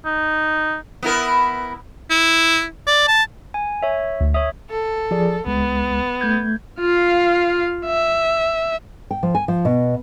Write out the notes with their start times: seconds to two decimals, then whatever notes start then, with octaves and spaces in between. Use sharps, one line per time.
0.06 D#4
1.03 B3 E4 A#4
2.10 E4
2.87 D5
3.08 A5
3.54 G#5
3.82 C#5 E5
4.20 D2
4.34 C#5 E5 D#6
4.70 A4
5.11 F3 G#4 D5
5.46 C#2 G#3 B3
6.21 A3 G6 G#6
6.81 F4 F5
7.86 E5
9.11 G5
9.23 F3
9.35 G#5
9.48 F3
9.65 B2